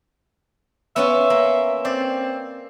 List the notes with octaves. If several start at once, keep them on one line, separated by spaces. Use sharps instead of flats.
B3 C#4 F4 E5
A#3
C4 D5